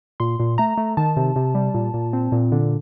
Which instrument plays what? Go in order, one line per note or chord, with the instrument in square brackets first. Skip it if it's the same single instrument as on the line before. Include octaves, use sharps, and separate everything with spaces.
[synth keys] A#2 C6
A#2
A3 A#5
A3
D#3 A5
C3
C3
G3
A#2
A#2
C4
A#2
D3